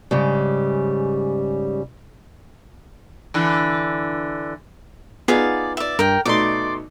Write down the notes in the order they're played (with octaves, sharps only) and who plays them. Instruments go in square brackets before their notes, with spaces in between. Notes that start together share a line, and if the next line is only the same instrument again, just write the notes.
[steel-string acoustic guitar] G#2 C#3 G3
[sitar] D3 E3
[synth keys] B3 [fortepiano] D#4 F4 [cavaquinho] G#4 D5 F5
[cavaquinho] D5 E5
[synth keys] G2 [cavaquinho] A#4 G5
[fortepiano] B2 A3 D#4 [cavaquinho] D5 [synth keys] C6 D6